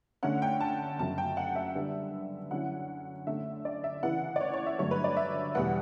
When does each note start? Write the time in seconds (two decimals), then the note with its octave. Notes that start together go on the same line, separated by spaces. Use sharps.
0.23 D3 A3 C#4 F#5
0.42 G5
0.60 A5
0.99 F#2 C#3 F#3 A5
1.18 G5
1.37 F#5
1.56 E5
1.75 D3 G3 B3 D4
2.51 D3 F#3 C#4 E4 F#5
3.27 D3 A3 C#4 E5
3.65 D5
3.84 E5
4.03 C#3 E3 B3 E4 F#5
4.36 D5
4.41 C#5
4.54 C#5
4.66 E5
4.79 G2 D3 F#3 A3 C#5
4.91 B4
5.04 D5
5.17 E5
5.55 E2 B2 G3 B3 F#5